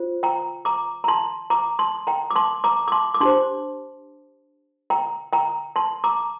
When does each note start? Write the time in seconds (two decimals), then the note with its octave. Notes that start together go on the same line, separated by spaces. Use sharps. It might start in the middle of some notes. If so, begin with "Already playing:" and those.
Already playing: F4 C5
0.23 G5 A#5
0.65 A#5 D6
1.04 A#5
1.08 A5 C6
1.50 A#5 D6
1.79 A5 C6
2.07 G5 A#5
2.30 D6
2.36 A5 C6
2.64 A#5 D6
2.88 D6
2.92 A5 C6
3.14 D6
3.20 D4 G4 C5 A5 C6
4.90 G5 A#5
5.33 G5 A#5
5.76 A5 C6
6.04 A#5 D6